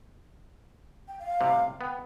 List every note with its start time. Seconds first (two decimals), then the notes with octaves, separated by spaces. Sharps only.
1.08 G5
1.20 F5
1.40 A2 C3 G3
1.81 B3 G5